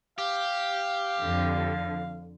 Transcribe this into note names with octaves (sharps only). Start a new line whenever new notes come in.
G4 F5
F2 D3